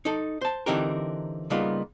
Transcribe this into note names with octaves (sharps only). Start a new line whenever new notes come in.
D#4 A4
C5 A5
D3 E3 C4 D#4 G4 A#4
C#3 G3 A#3 B3 D#4 F4